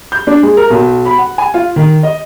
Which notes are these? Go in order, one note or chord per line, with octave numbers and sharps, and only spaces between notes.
G6
D4
G#3
A#4
B1
B5
F#5
G#5
F4
D#3
D#5